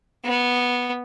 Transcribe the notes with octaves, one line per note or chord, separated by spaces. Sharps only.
B3